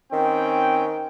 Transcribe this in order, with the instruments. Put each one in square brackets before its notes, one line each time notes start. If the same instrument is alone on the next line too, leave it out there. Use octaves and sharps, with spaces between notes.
[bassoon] D#3 [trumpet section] C4 C#4 G5